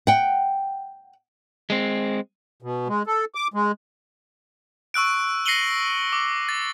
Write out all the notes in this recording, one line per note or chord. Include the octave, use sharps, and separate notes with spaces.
F#5 G5
G#3 C4
B2
G#3
A4
D6
G#3
C#6 E6 F#6 D7
A#6 C7 C#7 D#7 F#7 G7
D6
A6